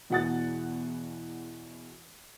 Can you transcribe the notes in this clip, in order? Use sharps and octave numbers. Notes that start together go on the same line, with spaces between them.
E2 B2 E3 F#5 D#6 A6